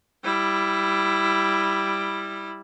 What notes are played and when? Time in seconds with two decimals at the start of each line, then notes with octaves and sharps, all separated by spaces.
0.23 G3 E4